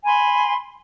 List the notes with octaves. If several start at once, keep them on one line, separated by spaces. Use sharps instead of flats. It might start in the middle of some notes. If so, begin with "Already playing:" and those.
G#5 B5 C6